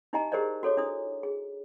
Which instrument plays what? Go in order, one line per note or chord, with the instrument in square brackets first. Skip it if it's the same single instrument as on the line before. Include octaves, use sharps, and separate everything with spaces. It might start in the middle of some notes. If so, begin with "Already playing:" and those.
[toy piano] D#4 E4 G4 D#5 G#5 A#5
G4 G#4 A#4 C5 D5 D#5
F#4 A4 C#5 D6
D4 E4 D#6
G#4